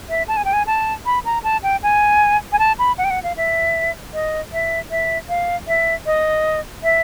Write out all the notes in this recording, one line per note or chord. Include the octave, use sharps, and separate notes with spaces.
E5
A5
G#5
G5
G#5
A5
B5
A#5
A5
G5
G#5
G#5
A5
B5
F#5
G5
F#5
F5
E5
D#5
E5
E5
F5
E5
D#5
E5